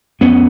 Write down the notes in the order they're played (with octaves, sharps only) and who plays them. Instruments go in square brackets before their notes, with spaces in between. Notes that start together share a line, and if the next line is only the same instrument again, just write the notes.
[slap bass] F2 B3 C#4